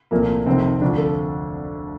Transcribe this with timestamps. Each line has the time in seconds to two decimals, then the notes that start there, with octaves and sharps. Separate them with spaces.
0.11 C2 A#2 F3 A3 A#3
0.46 F1 F2 C3 D#3 C4
0.81 D2 D3 F3 D4
0.97 A4